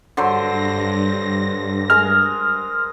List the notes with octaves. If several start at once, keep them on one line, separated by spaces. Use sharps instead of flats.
G2 D3 F#3 C5 A#6
G#3 A#4 F6